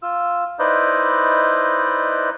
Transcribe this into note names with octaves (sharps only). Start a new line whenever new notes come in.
F4 E6
D#4 E4 B4 C5 D5 D#5